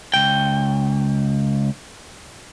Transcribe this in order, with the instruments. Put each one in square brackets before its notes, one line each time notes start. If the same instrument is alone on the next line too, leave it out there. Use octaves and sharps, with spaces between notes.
[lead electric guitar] C#2 G5